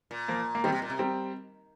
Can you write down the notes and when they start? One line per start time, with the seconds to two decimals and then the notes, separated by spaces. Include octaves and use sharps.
0.11 A#2
0.28 F3 A#3
0.55 A#3
0.64 D#3 G3 C4
0.72 C3
0.82 A#2
0.90 C3
0.99 G3 C4